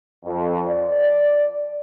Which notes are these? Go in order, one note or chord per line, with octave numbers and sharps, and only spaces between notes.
F2
D5